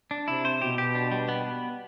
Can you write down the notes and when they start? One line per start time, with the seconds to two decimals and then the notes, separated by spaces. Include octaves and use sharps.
0.11 D4
0.28 C3 E4
0.45 C5
0.61 B2 G4
0.78 G4
0.95 D4
1.12 G3
1.28 B3